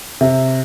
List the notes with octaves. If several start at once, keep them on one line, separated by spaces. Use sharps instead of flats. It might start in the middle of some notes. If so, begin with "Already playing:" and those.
C3